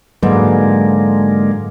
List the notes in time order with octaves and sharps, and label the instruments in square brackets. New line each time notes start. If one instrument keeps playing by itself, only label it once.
[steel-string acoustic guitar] G#2 [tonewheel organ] D3 G#3 A#3 [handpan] F#3 B4